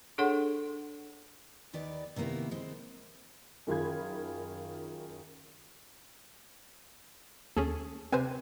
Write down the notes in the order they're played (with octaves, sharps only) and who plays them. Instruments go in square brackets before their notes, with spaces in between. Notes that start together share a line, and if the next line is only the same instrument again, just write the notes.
[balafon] D4 G#4 A4 C#5 F#5 C6
[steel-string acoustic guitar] D#2 D#3 B4 D5
C3 D#3 A#3 B3 E4
G#3 C4
[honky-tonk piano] F#2 D#3 F4 G#4 B5 G#6
[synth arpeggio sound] D#2 [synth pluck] C#4 G#4 A4
[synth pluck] C3 G#5 [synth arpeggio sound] C4 B4 C5